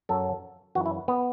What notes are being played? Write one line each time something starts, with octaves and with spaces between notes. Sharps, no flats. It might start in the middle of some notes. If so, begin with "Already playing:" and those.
F#2 F#3 A4
F#2 E3 F#4
E4
B3